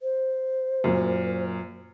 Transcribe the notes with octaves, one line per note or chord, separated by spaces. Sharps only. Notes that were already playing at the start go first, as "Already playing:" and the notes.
C5
F#2 A#2